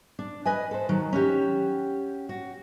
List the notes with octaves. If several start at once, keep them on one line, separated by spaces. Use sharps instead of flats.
D4
B4 D#5 G#5
A4 C5
D#3 F#3
C#4 F#4 G4
F#4